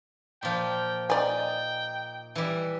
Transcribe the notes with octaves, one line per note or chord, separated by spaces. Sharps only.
A#2 F3 G5
D#4 D5 G5 G#5
E3 G3